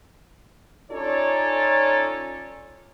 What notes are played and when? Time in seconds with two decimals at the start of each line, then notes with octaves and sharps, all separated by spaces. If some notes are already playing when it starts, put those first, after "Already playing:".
0.91 C#4 D#4 F4 A4 C#5 D5